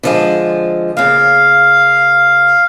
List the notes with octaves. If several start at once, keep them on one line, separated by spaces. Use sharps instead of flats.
D3 F3 G#3
C#3 A#3 F5